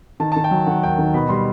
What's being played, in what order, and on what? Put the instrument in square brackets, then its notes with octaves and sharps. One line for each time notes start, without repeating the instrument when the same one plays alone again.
[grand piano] D#3 A5
A5
D#3
G5
F#3
D#3 F#5
D#2 G5
D#3
B2 B5
G3 C6